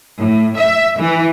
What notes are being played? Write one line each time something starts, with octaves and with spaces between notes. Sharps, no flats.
A2
E5
E3